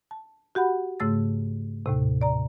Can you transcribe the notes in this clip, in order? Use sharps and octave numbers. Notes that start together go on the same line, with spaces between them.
A5
F#4 G4 F#5 B5
G#2 C#3 A3 E6 A6
D#2 A2 C3
D5 A#5